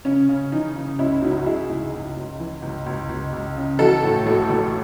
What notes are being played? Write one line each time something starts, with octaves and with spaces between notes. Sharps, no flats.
C#3 C#4
C#3
E3 D#4
C#3
C#2 C#4 E4
C#2 D#4 F#4
E4
F#4
C#2 E4 G#4
C#2
C#2
C#2
E3
C#2
C#2
C#2
C#2
C#3
E3 F#4 A4
A2
A1 F#4 A4
A1